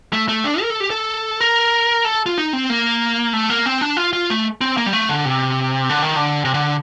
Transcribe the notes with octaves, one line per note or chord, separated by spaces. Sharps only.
A3
A3
D4
A#4
A4
G4
A4
A#4
A4
F4
D#4
C4
A#3
A3
A#3
C4
D4
F4
F4
A3
C4
A#3
G3
A3
D3
C3
D3
D#3
D3
C3
D3